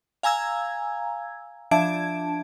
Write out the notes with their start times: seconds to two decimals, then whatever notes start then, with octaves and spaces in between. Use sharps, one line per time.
0.23 F5 G#5 A#5 E6 G#6
1.71 F3 D4 E5 A5 G#6 D7